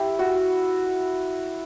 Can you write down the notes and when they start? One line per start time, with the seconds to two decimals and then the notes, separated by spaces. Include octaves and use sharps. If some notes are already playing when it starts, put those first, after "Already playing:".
Already playing: E4 G4
0.19 F#4